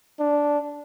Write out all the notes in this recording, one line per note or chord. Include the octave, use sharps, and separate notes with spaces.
D4